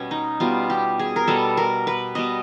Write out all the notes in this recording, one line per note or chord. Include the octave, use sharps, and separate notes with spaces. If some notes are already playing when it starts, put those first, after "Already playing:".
Already playing: B2 G3 B3 C#4
D#4
B2 G3 B3 F4
G4
G#4
A#4
B2 G3 B3 A4
A#4
B4
B2 G3 B3 D#5